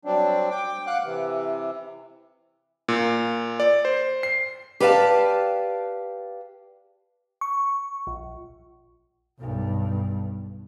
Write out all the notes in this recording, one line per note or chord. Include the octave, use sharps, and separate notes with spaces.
F#3 G3 C4 D4
G5 D6
F5 F#5 D6 F#6
C3 E3
A#2
D5
C5
C7
G4 B4 D5 F5 G5 A5
C#6
A#1
B1 G2